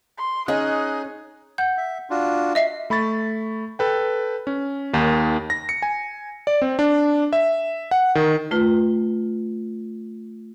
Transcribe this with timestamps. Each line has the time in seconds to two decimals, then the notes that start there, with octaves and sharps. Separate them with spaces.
0.18 C6
0.48 C#4 D#4 G#4 D#5 F#6
1.58 F#5 G6
1.77 E5
2.10 D4 F4 F#4
2.55 D#5 E5 C7
2.90 A3 B5 C#6 A6
3.79 A4 B4 G5
4.47 C#4
4.93 D#2 D#3
5.50 A#6
5.69 C#7
5.82 G#5
6.47 D5
6.62 C4
6.79 D4
7.33 E5
7.91 F#5
8.15 D#3
8.51 A3 F4 B4